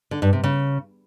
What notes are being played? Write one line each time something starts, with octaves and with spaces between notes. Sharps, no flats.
D3
G2
C3
C#3